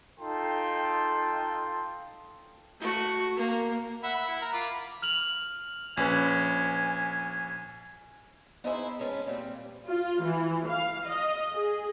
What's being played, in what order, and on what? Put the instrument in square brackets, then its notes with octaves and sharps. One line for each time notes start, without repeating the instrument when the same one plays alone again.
[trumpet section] D#4 F4 A4 G5 C6
[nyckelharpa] A3 F#4
A#3
[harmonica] E5 F#5 B5
E4
A#4
F4 B5 D6
[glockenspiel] F6 F7 F#7
[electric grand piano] A#1 C#4 B4 [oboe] G#5
[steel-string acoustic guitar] B3 D#4 E4 G#4 C5 E5
E2 G#3 C#4 B4 C#5 A5
A#2 G3 C4
[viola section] F4
E3
F5
D#5
G#4